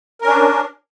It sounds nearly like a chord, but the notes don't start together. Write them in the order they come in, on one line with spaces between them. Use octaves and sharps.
A#4 C#4 D4